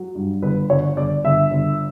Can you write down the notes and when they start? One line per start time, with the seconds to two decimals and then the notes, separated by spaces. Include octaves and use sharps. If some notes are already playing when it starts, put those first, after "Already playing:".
Already playing: F#3
0.15 G2
0.42 G1 B4
0.70 G1 C#5
0.97 G1 D5
1.24 G1 E5
1.51 G1